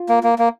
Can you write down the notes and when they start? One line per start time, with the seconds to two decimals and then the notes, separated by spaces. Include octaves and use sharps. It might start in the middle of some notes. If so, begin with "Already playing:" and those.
Already playing: F4
0.09 A#3
0.23 A#3
0.39 A#3